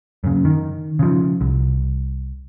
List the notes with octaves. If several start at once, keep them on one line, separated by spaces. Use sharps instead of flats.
F#2 C#3
D#3
C#3 F3
C2